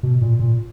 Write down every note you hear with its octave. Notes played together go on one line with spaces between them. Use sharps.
B2
A#2
A#2